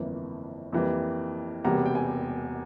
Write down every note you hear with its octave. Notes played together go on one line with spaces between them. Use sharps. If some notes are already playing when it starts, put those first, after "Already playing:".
Already playing: G1 F2 E3 A#3
F2 E3 G3 A#3
E1 E2 C3 G3 A#3 A#5
G5
G#5